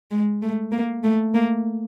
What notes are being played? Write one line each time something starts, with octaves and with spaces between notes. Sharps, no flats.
G#3
A3
A#3
A3
A#3